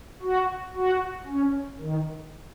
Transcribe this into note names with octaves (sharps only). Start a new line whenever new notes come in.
F#4
F#4
C#4
D#3